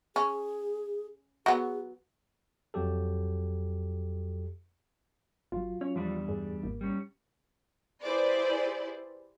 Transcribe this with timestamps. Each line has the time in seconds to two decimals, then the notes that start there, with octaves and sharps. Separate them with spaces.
0.16 C#4 G#4
1.46 F#3 B3 G#4
2.74 F2 F#3 G4 A4
5.52 G1 F#3 F4
5.81 C#4 C#5
5.96 E2 F3 G3 D4
6.28 G2 G#4
6.63 G#1 A#3
6.81 G3 C#4
8.04 E4 G4 G#4 B4 C5 D5